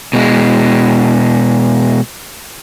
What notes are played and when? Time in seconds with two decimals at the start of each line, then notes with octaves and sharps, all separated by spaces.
0.13 B2 G#3